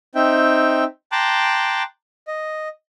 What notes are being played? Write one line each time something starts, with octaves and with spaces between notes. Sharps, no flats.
C4 D#4 E5 G5
G5 A5 A#5 C6 D6 F#6
D#5